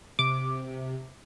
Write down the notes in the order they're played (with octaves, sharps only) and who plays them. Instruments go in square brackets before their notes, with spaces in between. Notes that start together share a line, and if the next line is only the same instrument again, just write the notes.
[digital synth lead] C3 [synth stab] D6